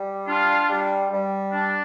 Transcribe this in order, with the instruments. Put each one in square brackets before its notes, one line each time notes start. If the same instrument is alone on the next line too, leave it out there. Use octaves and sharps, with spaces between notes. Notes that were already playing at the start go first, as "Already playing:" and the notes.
Already playing: [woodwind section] G3
D4 F4
G3
G3
D4